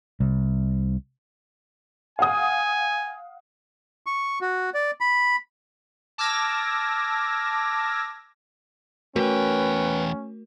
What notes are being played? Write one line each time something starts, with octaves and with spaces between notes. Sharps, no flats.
C2
F5 F#5 G#5 D#6
C#6
F#4
D5
B5
A5 D6 E6 F6 G#6 A#6
E2 A3 C#4 F#4 A#4 B4 G5